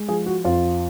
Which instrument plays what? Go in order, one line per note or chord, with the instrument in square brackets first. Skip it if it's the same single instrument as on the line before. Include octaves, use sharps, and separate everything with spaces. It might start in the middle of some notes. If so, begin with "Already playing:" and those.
Already playing: [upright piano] G#3
F3 G#4
F#4
F2 F4